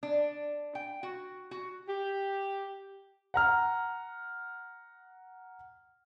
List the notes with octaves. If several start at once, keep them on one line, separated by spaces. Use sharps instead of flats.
D4
G5
F#4
F#4
G4
F#5 A#5 F6